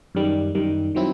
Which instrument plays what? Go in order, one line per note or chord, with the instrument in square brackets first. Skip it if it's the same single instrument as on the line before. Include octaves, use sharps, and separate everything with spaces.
[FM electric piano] F#2 D#3 G3
F#2 D#3 G3
D#3 F#3 C4 E4